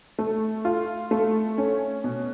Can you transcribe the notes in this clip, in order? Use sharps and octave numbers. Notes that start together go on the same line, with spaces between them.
A3
F4
A3
C#4
B2